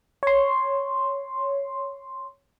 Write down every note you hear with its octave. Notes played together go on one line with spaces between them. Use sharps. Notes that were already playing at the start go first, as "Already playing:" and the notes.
C#5 C6